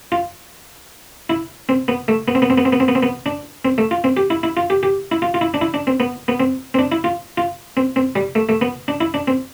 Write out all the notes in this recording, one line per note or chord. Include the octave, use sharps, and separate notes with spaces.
F4
E4
C4
B3
A3
B3
C4
B3
C4
B3
C4
B3
C4
B3
C4
B3
D4
C4
A3
F4
C4
G4
E4
E4
F4
G4
G4
E4
F4
F4
E4
D4
E4
D4
C4
B3
B3
C4
C4
D4
E4
F4
F4
C4
C4
G3
A3
A3
B3
D4
E4
D4
C4